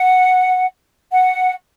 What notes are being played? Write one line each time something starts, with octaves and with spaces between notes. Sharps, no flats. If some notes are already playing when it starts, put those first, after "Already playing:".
Already playing: F#5
F#5